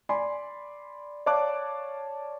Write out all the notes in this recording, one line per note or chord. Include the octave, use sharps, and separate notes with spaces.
D5 G#5 B5 C6
C#5 D5 F5 A5 D6 F#6